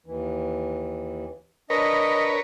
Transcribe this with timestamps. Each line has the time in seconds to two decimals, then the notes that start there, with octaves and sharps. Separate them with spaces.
0.06 D#2 E3
1.70 D4 A#4 B4 C#5 D#5